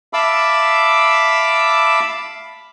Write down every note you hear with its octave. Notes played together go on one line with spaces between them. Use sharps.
E5 F5 A5 B5 D6 E6